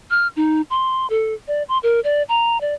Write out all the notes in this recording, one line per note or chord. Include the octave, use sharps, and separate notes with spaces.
F6
D#4
C6
A4
D5
C6
A#4
D5
A#5
D5